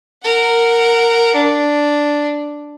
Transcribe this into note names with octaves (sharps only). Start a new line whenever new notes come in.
A#4 F#5
D4